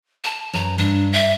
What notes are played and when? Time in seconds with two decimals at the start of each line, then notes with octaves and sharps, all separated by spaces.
0.24 A5
0.53 F#2 B4 A#5
0.78 G2 D4
1.13 E5